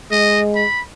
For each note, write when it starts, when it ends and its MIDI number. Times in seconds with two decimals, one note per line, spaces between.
0.11 0.65 56
0.11 0.40 75
0.55 0.82 83